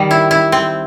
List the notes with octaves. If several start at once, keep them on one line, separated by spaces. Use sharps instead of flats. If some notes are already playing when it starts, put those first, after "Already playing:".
Already playing: D#3 G3
E4
E4
C4